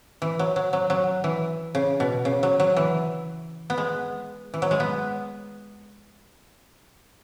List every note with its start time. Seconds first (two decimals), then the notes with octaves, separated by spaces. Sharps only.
0.22 E3
0.39 F#3
0.56 F#3
0.73 F#3
0.90 F#3
1.24 E3
1.75 C#3
2.00 B2
2.25 C#3
2.43 F#3
2.60 F#3
2.77 E3
3.70 B3
3.78 G#3
4.54 E3
4.62 F#3
4.71 G#3
4.80 B3